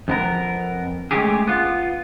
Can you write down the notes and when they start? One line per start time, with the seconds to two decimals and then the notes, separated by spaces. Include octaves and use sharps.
0.08 F2 B3 A#4
1.11 G#3 A3 C#4 G4 G#4
1.47 B3 F4